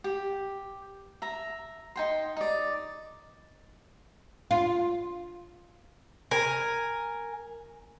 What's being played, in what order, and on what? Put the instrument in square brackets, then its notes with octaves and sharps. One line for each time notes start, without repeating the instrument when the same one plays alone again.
[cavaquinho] G4
E5 A#5
D#4 G5 C6
D#4 D5
[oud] F4
[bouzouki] A#4 G#5